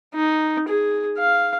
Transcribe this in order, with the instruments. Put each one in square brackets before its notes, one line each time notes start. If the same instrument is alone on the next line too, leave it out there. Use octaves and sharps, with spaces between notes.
[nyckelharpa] D#4
G#4
F5